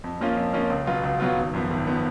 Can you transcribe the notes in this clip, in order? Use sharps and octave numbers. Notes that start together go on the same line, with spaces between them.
F2
F3 A#3 C#4 F4
F2
F3 A#3 C#4 F4
C#2
B2 F#3 B3 F4
C#2
B2 F#3 B3 F4
G#1
F#2 F3 B3
G#1
F3 B3